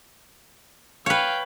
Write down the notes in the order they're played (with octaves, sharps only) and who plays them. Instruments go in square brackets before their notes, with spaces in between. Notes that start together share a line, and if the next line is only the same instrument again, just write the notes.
[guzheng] B4 C#5 [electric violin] F5 G5